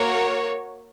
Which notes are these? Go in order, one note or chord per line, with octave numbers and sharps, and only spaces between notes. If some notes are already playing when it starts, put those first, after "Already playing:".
Already playing: A#3 F#4 A#4 C#5